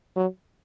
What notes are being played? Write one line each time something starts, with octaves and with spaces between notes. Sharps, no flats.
F#3